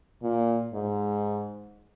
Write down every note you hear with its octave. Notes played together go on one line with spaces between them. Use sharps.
A#2
G#2